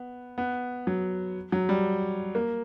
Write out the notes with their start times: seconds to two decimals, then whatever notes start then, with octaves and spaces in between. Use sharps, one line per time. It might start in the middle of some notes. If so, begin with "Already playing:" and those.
Already playing: B3
0.38 B3
0.87 F#3
1.52 F#3
1.69 G3
2.35 A#3